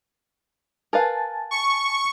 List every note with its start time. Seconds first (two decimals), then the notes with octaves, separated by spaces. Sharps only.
0.93 A#4 B4 F5 G#5 A5 A6
1.51 C#6